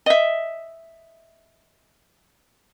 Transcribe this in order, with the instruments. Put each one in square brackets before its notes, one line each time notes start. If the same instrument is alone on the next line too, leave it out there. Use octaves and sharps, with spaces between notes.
[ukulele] D#5 E5